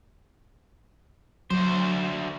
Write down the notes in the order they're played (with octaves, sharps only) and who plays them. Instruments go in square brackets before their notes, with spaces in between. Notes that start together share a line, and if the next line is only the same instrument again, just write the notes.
[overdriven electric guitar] D2 C5 [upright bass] F#3